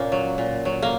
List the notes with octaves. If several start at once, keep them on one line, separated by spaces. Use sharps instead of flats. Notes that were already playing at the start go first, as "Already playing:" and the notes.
Already playing: A#2 A#3 C#4
F#3
A#2
F#3
A#3